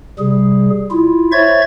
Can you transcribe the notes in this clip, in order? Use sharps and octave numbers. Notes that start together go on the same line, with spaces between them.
C3 G3 G#4
E4 F4
C5 C#5 E5 C#6 G#6 A6